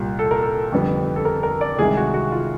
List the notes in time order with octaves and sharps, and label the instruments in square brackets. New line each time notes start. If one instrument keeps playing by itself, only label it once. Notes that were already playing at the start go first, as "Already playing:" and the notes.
Already playing: [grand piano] C2 A#2 G3
A4
A#4
A4
F2 D3 G3 B3
A4
A#4
A#4
D5
C2 C3 D#3 G#3 G#4
F#4
F#4
F4